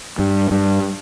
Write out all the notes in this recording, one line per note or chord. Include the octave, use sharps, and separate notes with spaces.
G2
G2